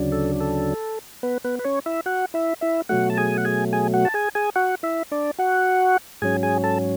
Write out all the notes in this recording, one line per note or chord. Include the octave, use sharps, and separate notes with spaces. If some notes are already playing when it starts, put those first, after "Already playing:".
Already playing: D2 C#3 F#3 D4
A4
A4
B3 B4
B3 B4
B4
C#4 C#5
E4 E5
F#4 F#5
E4 E5
E4 E5
B2 F#3 A3 F#4 F#5
A5
G#4 G#5
F#5
G#4 G#5
G#4 G#5
F#4 F#5
A5
G#4 G#5
G#4 G#5
F#4 F#5
E4 E5
D4 D5
F#4 F#5
G#2 F#3 C#4 G#4 G#5
G#4 G#5
A4 A5